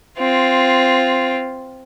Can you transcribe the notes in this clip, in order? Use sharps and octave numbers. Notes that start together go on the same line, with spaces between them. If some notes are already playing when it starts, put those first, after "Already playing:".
C4 F4